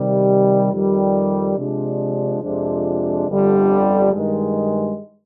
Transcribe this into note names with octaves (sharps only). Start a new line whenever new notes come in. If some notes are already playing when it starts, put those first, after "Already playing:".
Already playing: C3 D#3 G3
F2 D#3 G3
C3 F3 G#3 D4
F2 C3 F3 G#3 D4
G1 F2 D3 G3
G2 D#3 G#3